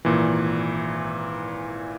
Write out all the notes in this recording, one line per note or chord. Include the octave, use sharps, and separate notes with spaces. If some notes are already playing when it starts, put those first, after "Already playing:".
G#1 A#2 E3